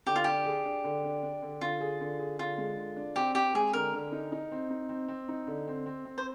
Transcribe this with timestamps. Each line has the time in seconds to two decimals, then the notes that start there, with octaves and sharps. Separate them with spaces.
0.06 D3 G4
0.16 F4
0.24 D4 G4
0.46 G#4
0.65 D4
0.84 D3
1.04 D4
1.23 D4
1.42 D3
1.61 D3 F4
1.81 G#4
2.01 D3
2.19 G#4
2.39 D3 F4
2.58 G#3
2.77 D3
2.96 D4
3.16 C4 G4
3.35 C4 G4
3.55 G#3 G#4
3.73 D3 A#4
3.93 D3
4.12 D#4
4.32 D#4
4.52 C4
4.70 D#4
4.89 C4
5.08 C4
5.28 D#4
5.47 D3
5.67 C4
5.86 C4
6.05 C4
6.18 C5